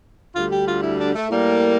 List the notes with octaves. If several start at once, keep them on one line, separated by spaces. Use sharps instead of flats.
D2 D3 G3 F4
G4
F4
E4
D4
A3
A2 G3 A#3